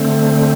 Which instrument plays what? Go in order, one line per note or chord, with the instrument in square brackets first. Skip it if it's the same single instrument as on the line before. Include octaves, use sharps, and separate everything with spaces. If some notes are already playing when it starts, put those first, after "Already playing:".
Already playing: [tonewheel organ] D3 A3 C4